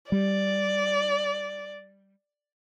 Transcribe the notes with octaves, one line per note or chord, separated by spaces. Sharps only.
G3 D5